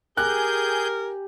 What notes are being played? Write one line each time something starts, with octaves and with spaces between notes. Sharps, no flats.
G4 G#4 A#4 G#5 A#5 F#6 G6